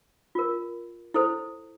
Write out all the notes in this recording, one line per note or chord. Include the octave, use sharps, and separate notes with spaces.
F4 A#4
E4 A4 C5